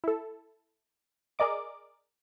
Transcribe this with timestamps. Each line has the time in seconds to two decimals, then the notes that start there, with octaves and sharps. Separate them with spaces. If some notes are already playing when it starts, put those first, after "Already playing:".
0.04 E4 A4
1.39 G#4 A#4 D5 D#5 D6